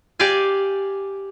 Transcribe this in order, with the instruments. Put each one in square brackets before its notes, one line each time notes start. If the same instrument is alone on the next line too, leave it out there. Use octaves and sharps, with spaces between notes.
[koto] G4 D5 F5 G#5